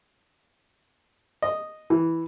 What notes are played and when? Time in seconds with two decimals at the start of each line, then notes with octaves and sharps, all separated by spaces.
1.42 D#5
1.90 E3